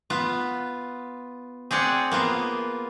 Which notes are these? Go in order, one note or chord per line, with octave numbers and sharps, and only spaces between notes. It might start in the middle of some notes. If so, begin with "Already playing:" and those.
B3 F4
C4 G#4 D5 F#5
A#3 B3 F4